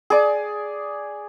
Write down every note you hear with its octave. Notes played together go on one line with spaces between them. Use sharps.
G#4 D5